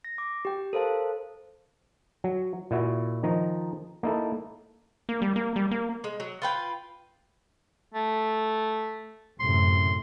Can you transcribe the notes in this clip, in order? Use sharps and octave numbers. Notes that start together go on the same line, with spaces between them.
A#6
D6
G4 G5
A4 A#4 C5 F5 A5
F#3
A#2 E4 F#4
D#3 F3 D#4 A#5
A#3 D#4 E4 A4
A#3
G3
A#3
G3
A#3
G#3
F#3
F4 B4 G5
A3
F#2 A2 C3 C6